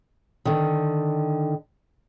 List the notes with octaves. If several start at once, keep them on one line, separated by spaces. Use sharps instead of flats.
D3 D#3